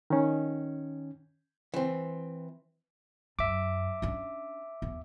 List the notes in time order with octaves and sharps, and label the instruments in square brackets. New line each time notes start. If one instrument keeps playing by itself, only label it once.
[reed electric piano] D#3 C#4
[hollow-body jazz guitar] E3 C4
[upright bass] F#2 [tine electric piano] E5 D6
[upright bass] C#4 D4
E2